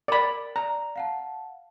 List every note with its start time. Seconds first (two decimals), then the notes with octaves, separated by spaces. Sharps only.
0.08 A#4 D5 B5
0.56 D5 A#5
0.96 F5 F#5 A5